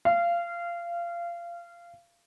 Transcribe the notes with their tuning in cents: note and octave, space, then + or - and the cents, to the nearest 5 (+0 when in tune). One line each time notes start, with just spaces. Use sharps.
F5 -20